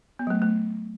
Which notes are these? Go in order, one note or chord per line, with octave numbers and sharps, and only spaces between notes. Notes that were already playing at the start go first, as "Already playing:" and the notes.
B3
F#3
A3
A3